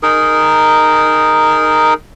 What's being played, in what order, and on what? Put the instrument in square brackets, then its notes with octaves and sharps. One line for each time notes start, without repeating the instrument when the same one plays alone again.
[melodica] D#4 G#4 A#4